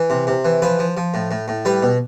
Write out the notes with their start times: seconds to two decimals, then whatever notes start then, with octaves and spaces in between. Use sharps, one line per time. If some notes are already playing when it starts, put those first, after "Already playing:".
Already playing: E3
0.10 C3
0.27 C3
0.45 E3
0.62 F3 B4
0.79 F3
0.97 F3
1.14 A2
1.31 A2
1.48 A2
1.65 G3 B4
1.83 B2